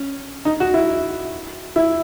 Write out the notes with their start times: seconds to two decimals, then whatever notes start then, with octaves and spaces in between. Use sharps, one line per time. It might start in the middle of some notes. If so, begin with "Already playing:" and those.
Already playing: C#4
0.45 D#4
0.60 F#4
0.74 E4
1.76 E4